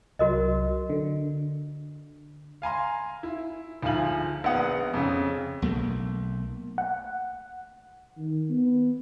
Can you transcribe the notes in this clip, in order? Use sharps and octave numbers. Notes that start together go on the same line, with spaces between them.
C2 F#3 F#4 A#4 D#5
D3
F5 G#5 A#5 C6
E4
D2 G#2 F3 F4 G#5 F#7
A#1 B3 F#5 D#6
F2 C#3
B1 A3 A#3
F#5
D#3
B3